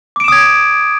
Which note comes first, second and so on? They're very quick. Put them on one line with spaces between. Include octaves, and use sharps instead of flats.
D6 D7 E7 D#6 G#6